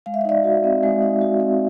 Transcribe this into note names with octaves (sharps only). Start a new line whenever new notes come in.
G#3 F5
E5
D#5
D#4 D5 E5
F#4
C4
G#3
D#4
F#4
C4